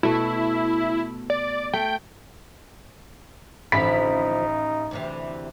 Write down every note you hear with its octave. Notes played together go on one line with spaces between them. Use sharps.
B2 A3 E4
D5
A3 G5
A1 D3 F3 D#4 B5 B6
D2 C3 E3